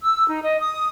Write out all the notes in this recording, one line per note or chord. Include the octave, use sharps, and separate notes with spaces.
E6
D#4
D#5
D#6